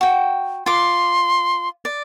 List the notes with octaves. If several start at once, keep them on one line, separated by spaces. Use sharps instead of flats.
F#4 G5
F4 C6 D6
D5